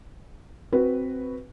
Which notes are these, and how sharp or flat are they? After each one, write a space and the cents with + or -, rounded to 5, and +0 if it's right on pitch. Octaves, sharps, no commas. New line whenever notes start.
C4 +0 F#4 +0 B4 +0